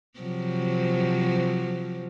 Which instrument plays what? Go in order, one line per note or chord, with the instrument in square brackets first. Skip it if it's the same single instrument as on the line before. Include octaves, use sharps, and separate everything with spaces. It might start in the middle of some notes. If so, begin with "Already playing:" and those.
[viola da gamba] C3 F3 F#3